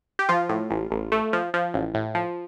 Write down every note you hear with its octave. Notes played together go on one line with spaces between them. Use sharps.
G4
F3 F4
A2
A1
A1
A3
F3
F3
A1
A2
F3